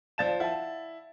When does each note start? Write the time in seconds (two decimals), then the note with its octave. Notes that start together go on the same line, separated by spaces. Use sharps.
0.18 F3 D5 F5 A5 A6 E7
0.40 E4 F#5 A5